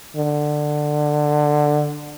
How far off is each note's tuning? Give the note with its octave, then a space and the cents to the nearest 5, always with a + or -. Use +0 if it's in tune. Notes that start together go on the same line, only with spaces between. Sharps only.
D3 +15